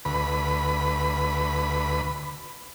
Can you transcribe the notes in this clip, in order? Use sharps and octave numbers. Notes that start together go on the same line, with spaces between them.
D2 B4 B5